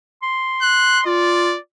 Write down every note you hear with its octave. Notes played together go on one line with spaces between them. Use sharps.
C6
F#6
F4 D5